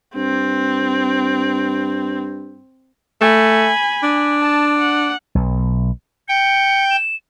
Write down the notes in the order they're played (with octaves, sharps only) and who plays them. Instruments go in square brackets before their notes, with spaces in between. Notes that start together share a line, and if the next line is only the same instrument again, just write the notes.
[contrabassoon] G2 [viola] C4
[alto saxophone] A3 [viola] G#5 B5
[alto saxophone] D4
[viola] A5
F#5
[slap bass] B1
[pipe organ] G5 [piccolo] C#7
[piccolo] E7